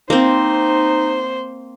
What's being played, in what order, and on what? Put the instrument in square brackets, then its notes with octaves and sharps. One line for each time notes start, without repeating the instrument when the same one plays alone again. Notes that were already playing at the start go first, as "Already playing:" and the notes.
[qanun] A#3 C4 [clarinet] D#4 [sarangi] C5